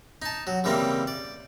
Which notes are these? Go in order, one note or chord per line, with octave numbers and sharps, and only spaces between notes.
D#4 A5
F#3
C#3 E3 G3 A#3 C4
D5